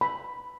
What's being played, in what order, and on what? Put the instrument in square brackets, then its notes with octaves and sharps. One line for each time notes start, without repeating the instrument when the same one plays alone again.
[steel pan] B5